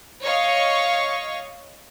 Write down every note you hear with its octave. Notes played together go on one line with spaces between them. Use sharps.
C#5 D#5 F5 C#6